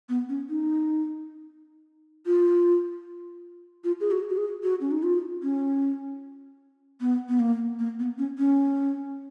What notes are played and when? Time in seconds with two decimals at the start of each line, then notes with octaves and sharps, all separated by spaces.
0.09 B3
0.29 C#4
0.49 D#4
2.26 F4
3.84 F4
4.00 G#4
4.11 F#4
4.30 F#4
4.38 G#4
4.63 F#4
4.81 C#4
4.91 D#4
5.03 F4
5.43 C#4
7.01 B3
7.29 B3
7.39 A#3
7.79 A#3
7.99 B3
8.18 C#4
8.38 C#4